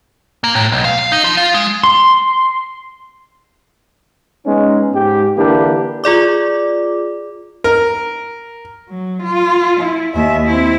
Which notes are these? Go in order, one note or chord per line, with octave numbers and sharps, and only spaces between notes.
A#3
A2
B1
F5
F5
D#4
F3
F4
G#3
C6
G#3 B3 C#4 D#4
G#2 G4
D3 E3 A#3 D4 E4 G4
F4 G#4 D5 D6
A#4
F#3
F4
E4
D#2 E5
C4 E4